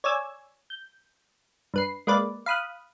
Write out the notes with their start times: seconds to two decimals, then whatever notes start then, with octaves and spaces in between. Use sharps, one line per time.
0.04 C#5 D5 G#5 E6 G#6
0.70 G6
1.74 G2 B4 C7
2.07 G#3 A#3 B4 D5
2.46 F5 B5 D#6 F#6